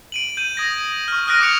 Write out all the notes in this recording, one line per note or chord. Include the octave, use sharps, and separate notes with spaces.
D7 D#7 F#7
G6 D#7
D#6 G#6 A#6
C#6 F6
D#6 F6 F#6 A#6 D7 D#7
D6 F6 A#6 C#7 D7 F7